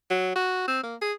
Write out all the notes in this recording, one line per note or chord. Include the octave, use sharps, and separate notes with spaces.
F#3
F#4
C4
A#3
G#4